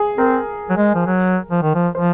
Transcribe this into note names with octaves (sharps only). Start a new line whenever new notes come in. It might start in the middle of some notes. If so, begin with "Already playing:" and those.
Already playing: G#4
C4 A#4
F#3
G#3
F3
F#3
F3
D#3
F3
F3 C5